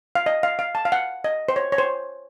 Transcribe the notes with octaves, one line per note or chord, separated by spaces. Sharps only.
F5
D#5
F5
F5
A5
F5
F#5
D#5
C5
C#5
C#5
C5